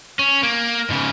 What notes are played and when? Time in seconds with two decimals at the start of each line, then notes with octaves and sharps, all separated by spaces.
0.19 C#4
0.43 A#3
0.90 G#2 C#3